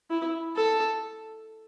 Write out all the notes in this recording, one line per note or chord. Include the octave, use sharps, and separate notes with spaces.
E4
A4